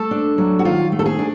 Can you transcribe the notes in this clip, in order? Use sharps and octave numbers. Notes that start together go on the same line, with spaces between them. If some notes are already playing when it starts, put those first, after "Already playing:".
Already playing: A3 A4
D4
F#3
F#4
D#3 F4
A3
A4
G#4
D4